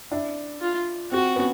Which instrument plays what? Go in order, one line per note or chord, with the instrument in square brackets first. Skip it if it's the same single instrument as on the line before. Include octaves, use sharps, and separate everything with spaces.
[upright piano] D4 E4
[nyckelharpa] F4
[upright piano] C4 [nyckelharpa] F#4
[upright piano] B3 C#4